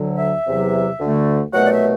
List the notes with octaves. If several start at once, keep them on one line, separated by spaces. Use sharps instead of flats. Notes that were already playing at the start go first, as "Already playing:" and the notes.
Already playing: D2 D3 F#3
E5
E2 C3 F#3
D2 D3 A3
C2 B2 F#3 A3 F#5
D5
E5